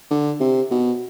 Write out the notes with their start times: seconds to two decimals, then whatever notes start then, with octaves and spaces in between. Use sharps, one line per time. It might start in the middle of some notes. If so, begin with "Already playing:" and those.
0.11 D3
0.40 C3
0.71 B2